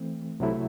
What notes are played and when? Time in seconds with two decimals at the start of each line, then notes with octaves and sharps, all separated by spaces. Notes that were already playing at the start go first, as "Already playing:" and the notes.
Already playing: E3 A3 C4
0.40 C2 C3 F#3 A3 E4